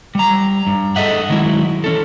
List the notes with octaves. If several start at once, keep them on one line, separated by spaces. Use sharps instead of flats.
G3 A#5
G2
G#4 A4 D#5 E5 F#5
D#3 F#3 G#3 E4
E3 C#4 A4